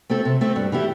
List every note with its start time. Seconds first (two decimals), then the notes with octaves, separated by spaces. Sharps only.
0.10 A3 C4 A4
0.25 C3
0.41 A3 C4 A4
0.56 G2
0.72 E3 A3 E4 G4